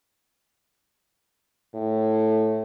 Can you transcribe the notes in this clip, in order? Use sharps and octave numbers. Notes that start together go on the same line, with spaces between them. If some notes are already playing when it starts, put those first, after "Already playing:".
A2